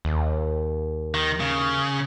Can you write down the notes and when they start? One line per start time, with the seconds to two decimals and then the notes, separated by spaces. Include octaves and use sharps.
0.05 D#2
1.14 D#3
1.40 C#3